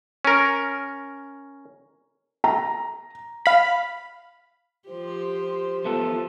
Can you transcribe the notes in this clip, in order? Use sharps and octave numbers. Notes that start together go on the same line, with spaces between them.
C#4 A#4
A#5
F5 B5
F3 G4 C5
F3 A3 B3 A4